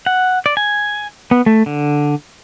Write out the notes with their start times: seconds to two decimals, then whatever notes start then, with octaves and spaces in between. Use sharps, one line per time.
0.06 F#5
0.46 D5
0.57 G#5
1.31 B3
1.46 A3
1.66 D3